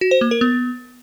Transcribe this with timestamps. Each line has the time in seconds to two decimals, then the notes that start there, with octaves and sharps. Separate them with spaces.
0.01 F#4
0.11 C5
0.21 A#3
0.31 A#4
0.41 B3